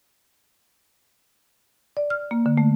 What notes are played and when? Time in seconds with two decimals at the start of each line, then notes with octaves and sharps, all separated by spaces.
1.97 D5
2.10 F6
2.31 A#3
2.46 D3
2.58 A3